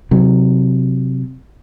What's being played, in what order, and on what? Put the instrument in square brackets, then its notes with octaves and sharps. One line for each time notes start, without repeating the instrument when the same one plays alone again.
[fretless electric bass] C3 F#3